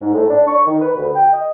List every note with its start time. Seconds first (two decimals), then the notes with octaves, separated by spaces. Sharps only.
0.02 G#2
0.14 A2
0.30 D4
0.48 C#6
0.65 D#3
0.81 B4
0.96 D2
1.15 G5
1.32 D#5